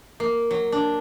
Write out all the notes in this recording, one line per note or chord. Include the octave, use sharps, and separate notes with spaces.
A#3
F#3
D4